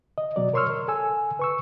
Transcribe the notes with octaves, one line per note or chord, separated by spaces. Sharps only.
D#5
B2 F#3 D5
A#4 C#5 C6 C#6 E6 F6
A#4
A4 G#5 E6
B4 C#6 E6